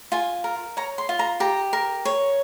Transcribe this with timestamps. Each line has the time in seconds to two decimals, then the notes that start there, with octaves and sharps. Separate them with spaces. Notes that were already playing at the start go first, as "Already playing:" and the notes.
0.12 F4 G#5
0.44 A#4
0.77 C#5 A#5
0.98 C6
1.09 F4
1.19 A#5
1.40 G4 A#5
1.73 A#4
2.05 C#5